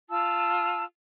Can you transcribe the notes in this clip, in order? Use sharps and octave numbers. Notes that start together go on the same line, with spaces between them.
F4 A5 E6